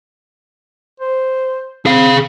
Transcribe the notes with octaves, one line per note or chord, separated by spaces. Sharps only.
C5
C4 G#4 F5